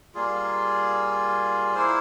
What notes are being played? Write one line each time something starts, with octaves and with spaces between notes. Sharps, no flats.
G3 A#3 F4 G#4
A#3 E4 C5